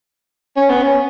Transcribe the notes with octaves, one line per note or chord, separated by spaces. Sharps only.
C#4
B3
C#4